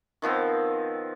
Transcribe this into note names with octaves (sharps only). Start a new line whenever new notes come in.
D#3 F3 B3 C4